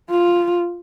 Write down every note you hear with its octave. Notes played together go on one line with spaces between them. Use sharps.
F4